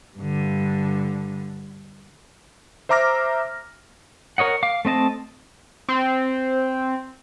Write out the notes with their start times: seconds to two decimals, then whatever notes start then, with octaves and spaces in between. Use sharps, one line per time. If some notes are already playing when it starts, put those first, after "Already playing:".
0.17 G2 D3
2.89 C5 E5 A#5 D6 F6 A#6
4.38 A#4 C#5 D#5 F#5
4.63 F5 D6
4.85 A3 C4 D#5 A5
5.89 C4